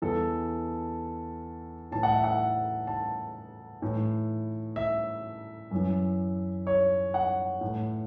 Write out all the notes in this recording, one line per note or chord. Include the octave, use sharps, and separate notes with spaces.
E2 E3 A4
A2 E3 A5
F#5
E5
F#5
A5
A2 E3
E5
F#2 E3
C#5
F#5
A2 E3